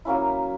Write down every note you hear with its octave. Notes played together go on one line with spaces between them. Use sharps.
F#3 A#3 C#4 E4